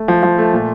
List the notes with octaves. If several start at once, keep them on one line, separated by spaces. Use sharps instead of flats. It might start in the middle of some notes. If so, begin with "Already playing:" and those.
Already playing: A3
F3
F3
A3
A#2